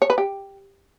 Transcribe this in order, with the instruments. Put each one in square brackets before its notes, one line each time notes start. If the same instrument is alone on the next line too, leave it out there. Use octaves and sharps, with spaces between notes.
[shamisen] C#5
B4
G4